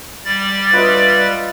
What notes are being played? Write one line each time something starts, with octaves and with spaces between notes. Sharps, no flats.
G3 D5 A6
F4 B4 D#5 E5